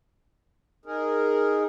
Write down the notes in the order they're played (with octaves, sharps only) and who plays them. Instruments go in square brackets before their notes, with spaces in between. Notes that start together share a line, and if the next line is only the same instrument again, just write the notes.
[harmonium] D#4 G#4 A#4